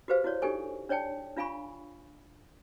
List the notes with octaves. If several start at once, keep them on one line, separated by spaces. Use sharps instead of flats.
F#4 G4 B4 C5 F5
E4 F#4 C#5 D5
D4 D#4 G4 A4 G#5 C#6
D4 C#5 D5 G5 A5
D4 F4 F5 G#5 B5 C#6